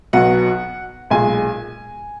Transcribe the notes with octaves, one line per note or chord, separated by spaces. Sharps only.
B1 B2 F#3 F#5
B1 A#2 G#3 G#5